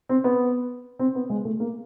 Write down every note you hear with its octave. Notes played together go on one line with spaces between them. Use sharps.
C4
B3
C4
B3
G#3
A3
A#3